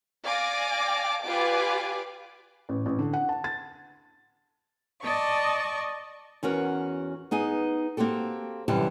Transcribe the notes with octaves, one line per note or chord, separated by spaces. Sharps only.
D5 F5 G#5 D6 A#6
F4 G4 B4 D5 G#5 D6
A1
A1
D3
F#5
A5
A6
D5 D#5 A5 C#6
E2 C#4 F#4 A#4
B3 D#4 G#4 G#5
A#3 C4 F#4 G4 A4
F#2 C3 E3 G3 G4 A5